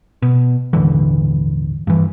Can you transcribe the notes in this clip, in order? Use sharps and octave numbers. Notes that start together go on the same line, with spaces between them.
B2
D#1 G#1 D3 E3
G2 E3